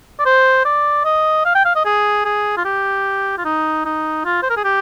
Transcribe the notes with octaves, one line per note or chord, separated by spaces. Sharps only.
D5
C5
D5
D#5
F5
G5
F5
D#5
G#4
G#4
F4
G4
F4
D#4
D#4
F4
C5
A#4
G#4
G4